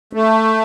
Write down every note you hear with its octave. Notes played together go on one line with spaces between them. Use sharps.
A3